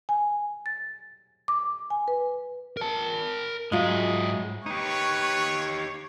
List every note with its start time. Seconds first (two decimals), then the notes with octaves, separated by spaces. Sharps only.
0.09 G#5
0.66 A6
1.48 D6
1.90 G#5
2.08 B4
2.77 A#4 A5
3.72 G#2 F#3 G#3 F4 E5
4.66 D#4 G4 B4 C#5 C#6